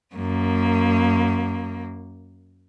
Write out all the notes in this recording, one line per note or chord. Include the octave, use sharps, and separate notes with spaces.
F#2 A#3